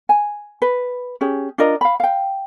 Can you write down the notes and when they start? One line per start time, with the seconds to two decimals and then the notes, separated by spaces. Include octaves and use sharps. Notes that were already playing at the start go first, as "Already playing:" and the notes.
0.09 G#5
0.62 B4
1.21 C#4 G4 G#4
1.58 D4 F4 A#4 D#5
1.81 F5 B5
2.00 F5 G5